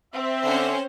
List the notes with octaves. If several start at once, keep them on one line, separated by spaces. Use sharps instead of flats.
C4 E5
D3 C#4 C5